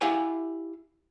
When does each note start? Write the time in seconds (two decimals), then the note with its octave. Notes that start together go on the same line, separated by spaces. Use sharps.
0.01 E4 G4 F5 F#5 G#5